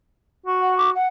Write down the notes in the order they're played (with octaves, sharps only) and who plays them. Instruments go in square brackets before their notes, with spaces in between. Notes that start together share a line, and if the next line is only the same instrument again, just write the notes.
[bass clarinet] F#4
[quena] F#5
D6
F#5